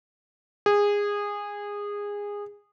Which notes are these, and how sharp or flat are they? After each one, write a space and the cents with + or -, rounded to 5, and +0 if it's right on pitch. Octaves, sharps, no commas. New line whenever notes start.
G#4 -20